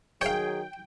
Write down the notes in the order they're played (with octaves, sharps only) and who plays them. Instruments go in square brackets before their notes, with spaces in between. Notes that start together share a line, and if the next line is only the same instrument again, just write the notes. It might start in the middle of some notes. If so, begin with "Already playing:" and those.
[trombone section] D#3 F#3 [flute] G#4 [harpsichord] C#5 F5 [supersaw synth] G5